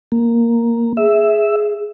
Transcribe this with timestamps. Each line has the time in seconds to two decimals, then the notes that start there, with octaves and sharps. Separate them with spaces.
0.12 A#3
0.97 G#4 E5